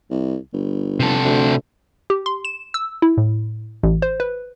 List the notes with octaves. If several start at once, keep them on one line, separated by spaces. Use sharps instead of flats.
C2
G1
C3 A4
D2
G4
C6
E7
E6
E4
A2
A1
C5
B4